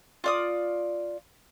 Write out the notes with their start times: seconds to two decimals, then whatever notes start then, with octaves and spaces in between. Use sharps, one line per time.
0.24 F4 D5 D#6